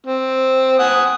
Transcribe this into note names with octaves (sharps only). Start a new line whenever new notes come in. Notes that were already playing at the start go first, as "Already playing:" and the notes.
C4
F#5 G#5 D#6